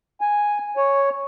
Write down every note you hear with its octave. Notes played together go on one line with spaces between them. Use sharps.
G#5
C#5